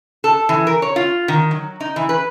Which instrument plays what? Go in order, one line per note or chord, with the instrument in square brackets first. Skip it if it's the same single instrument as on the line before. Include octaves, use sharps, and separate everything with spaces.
[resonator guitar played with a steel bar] A4
E3
A#4
C#5
F4
D#3
F#3
D#4
E3
B4